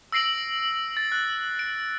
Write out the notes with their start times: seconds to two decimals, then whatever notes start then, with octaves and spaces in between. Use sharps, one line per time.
0.12 E6 A#6 C7 D7 F#7
0.97 A6
1.12 F#6
1.59 D7